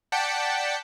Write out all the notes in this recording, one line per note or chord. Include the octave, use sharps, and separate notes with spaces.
D5 F#5 G5 A5 B6 C#7